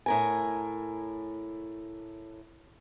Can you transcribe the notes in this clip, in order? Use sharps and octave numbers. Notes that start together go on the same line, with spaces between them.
A2 A#4 G#5